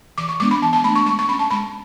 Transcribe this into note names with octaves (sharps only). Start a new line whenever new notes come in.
E3 D6
C#6
G#3 B3 D4 D6
B5
E3 A5
A5
A3 D4 B5
C#6
G#3 C#6
C#6
C#4 B5
A5
G#3 B5